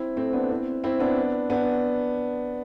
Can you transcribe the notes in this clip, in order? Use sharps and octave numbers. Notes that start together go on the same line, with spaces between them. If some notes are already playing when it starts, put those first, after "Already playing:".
Already playing: C4 E4
A3 C4
B3 D4
C4 E4
C4 E4
B3 D4
B3 D4